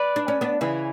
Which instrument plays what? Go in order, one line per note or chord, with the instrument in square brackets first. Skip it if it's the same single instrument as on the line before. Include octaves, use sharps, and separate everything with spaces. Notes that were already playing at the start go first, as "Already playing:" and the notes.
Already playing: [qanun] B4 D5
[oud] D4
C#4
B3 D4
C#3 E3